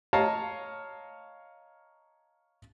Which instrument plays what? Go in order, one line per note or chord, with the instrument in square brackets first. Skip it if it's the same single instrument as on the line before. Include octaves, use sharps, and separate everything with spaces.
[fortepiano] C#5 D#5 F5 A5 A#5